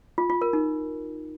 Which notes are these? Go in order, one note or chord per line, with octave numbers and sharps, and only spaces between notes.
F4
F4
A#4
D#4